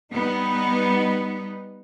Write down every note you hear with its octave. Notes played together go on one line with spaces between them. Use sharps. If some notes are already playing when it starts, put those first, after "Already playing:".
G3 B3 D#4